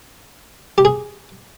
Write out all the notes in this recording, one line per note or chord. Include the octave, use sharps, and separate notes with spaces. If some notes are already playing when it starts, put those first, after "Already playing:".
G4
G#4